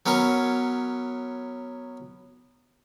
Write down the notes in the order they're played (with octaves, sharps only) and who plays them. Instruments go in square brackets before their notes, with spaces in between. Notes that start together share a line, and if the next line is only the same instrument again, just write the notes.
[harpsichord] F#3 B3 C#4 A#4 C#5